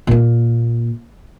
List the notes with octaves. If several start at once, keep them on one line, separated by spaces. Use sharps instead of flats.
A#2 A#3